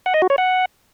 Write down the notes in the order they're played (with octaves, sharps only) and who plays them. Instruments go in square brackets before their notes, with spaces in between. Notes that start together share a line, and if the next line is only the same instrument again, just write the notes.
[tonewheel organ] F#5
D#5
F#4
C#5
F#5